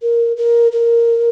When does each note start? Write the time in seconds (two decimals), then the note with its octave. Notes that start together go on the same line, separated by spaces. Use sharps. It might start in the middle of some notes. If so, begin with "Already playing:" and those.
0.02 A#4
0.37 A#4
0.72 A#4